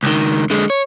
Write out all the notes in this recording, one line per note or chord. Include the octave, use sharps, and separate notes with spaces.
C#2 D#3
D3 G#3
C#5